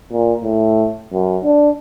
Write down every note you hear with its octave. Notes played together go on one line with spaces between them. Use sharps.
A#2
A2
F#2
D4